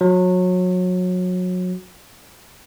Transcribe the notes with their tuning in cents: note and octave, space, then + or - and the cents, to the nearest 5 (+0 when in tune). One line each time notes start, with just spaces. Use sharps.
F#3 -25